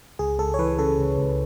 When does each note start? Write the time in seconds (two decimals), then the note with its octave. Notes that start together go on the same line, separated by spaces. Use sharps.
0.19 C#2 G#4
0.39 C#2 A4
0.54 C#5
0.59 E3 B4
0.79 C#3 A4
0.99 C#2
1.18 C#2